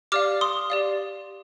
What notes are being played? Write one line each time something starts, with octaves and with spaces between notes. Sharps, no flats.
G4 D5 F5 D6 F6
C6 D#6
G4 D5 F5